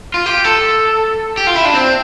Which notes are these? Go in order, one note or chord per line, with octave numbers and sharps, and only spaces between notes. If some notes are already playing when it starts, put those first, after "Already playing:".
F4
G4
A4
G4
F4
E4
D4
C4